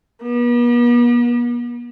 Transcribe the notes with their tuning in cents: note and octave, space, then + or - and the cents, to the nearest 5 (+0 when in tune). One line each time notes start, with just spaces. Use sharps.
B3 -45